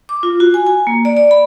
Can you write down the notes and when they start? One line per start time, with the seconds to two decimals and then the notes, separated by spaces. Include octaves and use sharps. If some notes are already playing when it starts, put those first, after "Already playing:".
0.09 D6
0.23 F4
0.40 F#4
0.54 G#5
0.67 G#5
0.87 A#3
1.05 D5
1.17 D5
1.31 B5